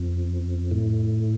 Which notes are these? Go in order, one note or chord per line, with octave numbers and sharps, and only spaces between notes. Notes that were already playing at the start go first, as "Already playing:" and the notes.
Already playing: F2
A2